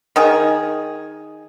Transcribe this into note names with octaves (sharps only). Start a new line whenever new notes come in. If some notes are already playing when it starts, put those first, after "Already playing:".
D#3 G#4